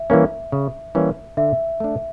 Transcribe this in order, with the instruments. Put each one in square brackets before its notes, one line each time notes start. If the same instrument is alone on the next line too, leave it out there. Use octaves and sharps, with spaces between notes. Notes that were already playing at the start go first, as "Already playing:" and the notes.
Already playing: [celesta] E5
[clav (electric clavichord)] E3 G3 A#3 C#4
C#3
E3 G3 A#3 C#4
[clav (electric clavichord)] D3 [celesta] E5
[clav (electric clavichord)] A3 D4